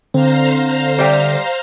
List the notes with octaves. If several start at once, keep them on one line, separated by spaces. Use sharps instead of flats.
D3 C4 C5 F5 A#5
G3 E5 G5